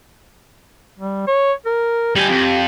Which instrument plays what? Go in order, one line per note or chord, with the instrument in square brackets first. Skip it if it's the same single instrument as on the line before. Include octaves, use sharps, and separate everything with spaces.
[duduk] G3
C#5
A#4
[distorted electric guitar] G3 G#5 [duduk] G4
[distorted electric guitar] F2